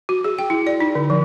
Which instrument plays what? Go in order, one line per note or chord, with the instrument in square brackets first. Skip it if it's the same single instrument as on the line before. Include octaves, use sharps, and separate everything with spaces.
[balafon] F#4
G#4
G5
E4
D5
D#4
D3
F3